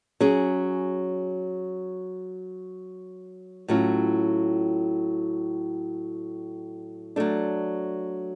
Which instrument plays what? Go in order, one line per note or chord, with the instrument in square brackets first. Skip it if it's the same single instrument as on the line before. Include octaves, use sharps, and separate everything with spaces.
[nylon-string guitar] F#3 C#4 G#4
A2 F#3 C#4 F4
F#3 A3 D4